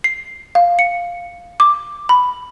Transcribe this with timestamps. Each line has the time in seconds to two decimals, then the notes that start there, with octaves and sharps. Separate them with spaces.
0.04 C7
0.55 F5
0.79 C#7
1.60 D6
2.09 B5